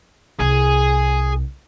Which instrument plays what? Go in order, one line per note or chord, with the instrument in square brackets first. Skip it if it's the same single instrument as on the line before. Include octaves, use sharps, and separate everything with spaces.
[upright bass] C2 [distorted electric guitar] G#4